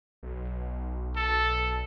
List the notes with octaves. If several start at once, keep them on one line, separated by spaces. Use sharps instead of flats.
B1
A4